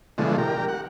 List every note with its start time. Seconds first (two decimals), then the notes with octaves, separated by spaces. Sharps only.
0.18 B2 D3 E3 F3 G#3 A3
0.38 G4 A#4
0.68 F#5